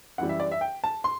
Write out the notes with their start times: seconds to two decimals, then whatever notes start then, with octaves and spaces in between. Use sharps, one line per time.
0.18 F#2 E3 G3 F#5
0.29 E5
0.40 D5
0.52 E5
0.61 G5
0.84 A5
1.04 C6